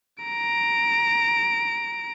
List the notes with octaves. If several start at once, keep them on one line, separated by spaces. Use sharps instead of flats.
A#5 D7